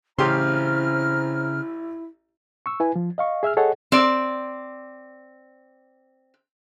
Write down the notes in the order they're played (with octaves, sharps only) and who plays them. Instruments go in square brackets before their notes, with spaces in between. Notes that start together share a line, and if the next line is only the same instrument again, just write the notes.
[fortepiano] A1 G4 C6 [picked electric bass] C#3 [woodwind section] C4 A#5 F6 [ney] E4
[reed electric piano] C#6 E6
E4 B4 G#5
F3
D#5 F5 C#6
G#4 E5 E6 F6
G#4 A4 C#5 D#5 F#5
[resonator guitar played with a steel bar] C4 D5